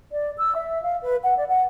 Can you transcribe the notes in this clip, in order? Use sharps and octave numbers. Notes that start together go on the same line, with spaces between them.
D5
E6
E5
F5
B4
F#5
D5
F#5